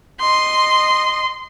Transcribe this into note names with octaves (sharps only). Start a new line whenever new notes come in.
D#5 C6